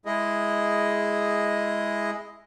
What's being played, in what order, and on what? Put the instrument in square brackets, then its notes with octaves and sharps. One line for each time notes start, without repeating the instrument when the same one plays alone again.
[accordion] G#3 E4 G#4 D#5